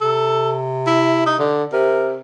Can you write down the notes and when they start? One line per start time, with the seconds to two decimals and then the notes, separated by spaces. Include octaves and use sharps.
0.01 C3 A4
0.87 E4
1.26 D#4
1.39 D3
1.73 C3 A#4